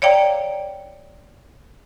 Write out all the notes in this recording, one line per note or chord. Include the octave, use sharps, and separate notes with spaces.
C#5 D5 F5 G5 A#5